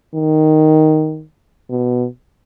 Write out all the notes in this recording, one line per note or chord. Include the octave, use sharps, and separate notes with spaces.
D#3
B2